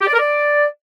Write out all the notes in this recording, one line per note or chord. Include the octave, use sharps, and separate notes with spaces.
G4
D5
A#4
D5